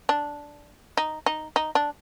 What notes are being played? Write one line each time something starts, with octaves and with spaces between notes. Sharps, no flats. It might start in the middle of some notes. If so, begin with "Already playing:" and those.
D4
D#4
D#4
D#4
D4